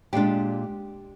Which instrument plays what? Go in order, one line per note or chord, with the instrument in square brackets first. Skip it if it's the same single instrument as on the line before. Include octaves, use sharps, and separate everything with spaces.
[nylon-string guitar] A#2 G#3 D4 G4